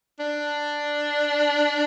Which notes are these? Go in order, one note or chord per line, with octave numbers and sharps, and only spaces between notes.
D4